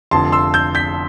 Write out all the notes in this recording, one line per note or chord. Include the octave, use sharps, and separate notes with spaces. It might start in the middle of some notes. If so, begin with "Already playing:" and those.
F1 F2 D3 F3 A5 C6
C6 E6
E6 G6
G6 B6